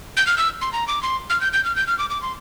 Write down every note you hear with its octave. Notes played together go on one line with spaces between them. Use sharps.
G6
F6
E6
C6
A#5
D6
C6
F6
G6
G6
F6
G6
F6
D6
D6
C6